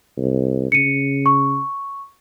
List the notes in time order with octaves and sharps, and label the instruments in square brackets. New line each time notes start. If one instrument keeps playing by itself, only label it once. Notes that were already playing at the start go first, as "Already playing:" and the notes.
[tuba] C2
[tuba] C#3 [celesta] C#7 D#7
[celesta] C#6